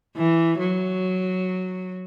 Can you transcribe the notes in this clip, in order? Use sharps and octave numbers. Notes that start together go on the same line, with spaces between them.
E3
F#3